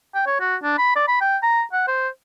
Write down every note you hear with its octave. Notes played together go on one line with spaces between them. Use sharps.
G5
C#5
F#4
D4
B5
D5
B5
G5
A#5
F#5
C5